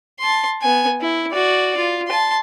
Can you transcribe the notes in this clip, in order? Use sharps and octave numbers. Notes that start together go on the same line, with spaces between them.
A5 C6
B3 G#5
E4
F#4 D5
F4
A5 C6